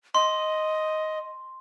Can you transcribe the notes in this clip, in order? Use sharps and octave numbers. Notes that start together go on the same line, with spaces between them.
D#5 C6